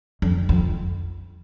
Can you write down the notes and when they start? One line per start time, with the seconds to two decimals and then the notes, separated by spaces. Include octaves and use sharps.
0.22 F2
0.49 F2